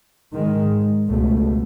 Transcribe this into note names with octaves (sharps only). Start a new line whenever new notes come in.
G#2 D#3 G#3
C#2 B2 A3